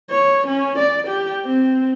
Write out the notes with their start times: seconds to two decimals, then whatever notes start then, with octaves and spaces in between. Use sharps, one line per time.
0.11 C#5
0.47 C#4
0.79 D5
1.08 G4
1.46 C4